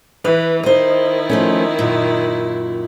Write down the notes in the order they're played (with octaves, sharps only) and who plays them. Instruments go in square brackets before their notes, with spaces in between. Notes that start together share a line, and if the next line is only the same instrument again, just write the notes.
[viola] E3 [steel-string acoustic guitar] B4
[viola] D#3 E4 [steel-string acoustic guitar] C5 D#5
[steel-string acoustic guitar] F3 A3 C#4
F#2 A#2